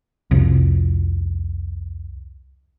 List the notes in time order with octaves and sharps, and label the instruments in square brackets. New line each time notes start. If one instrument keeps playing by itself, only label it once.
[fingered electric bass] C2 F2